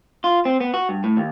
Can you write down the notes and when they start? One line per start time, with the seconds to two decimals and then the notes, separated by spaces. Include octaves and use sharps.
0.24 F4
0.45 C4
0.60 B3
0.74 F#4
0.89 G2
1.04 A2
1.17 D#2